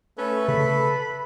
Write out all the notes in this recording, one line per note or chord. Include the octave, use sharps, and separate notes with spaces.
A3 C#4 A4 B4
C#3 B5 B6